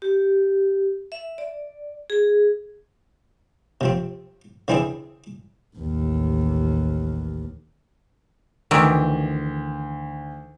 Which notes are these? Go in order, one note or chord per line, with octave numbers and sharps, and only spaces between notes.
G4
E5
D5
G#4
C3 F3 C4
C#3 E3 C4 D4 E4 G#4
A1 D#2
D2 D#3 E3